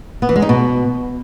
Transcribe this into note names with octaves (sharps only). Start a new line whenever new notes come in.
B3
E3
G#3
D#4
B2